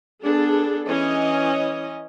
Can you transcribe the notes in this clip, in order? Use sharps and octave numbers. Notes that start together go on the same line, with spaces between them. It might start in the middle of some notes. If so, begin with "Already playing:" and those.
B3 D4 G#4 A4
E3 C#4 D#5